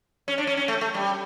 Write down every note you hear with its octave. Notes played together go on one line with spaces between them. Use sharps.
C#4
D4
C#4
C#4
A3
A3
G3